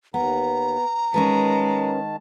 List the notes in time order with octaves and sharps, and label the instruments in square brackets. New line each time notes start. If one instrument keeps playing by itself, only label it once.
[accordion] D#2 [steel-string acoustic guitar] B3 [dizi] A#5
[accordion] D#3 A5 [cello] G#3 [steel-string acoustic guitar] C#4 A#4 B4